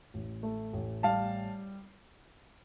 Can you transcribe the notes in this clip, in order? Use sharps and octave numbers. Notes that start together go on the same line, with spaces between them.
A1
A3
A1
G3 F5 A5